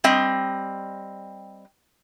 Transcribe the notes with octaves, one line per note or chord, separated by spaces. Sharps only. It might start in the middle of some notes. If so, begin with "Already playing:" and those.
G3 C4 D#5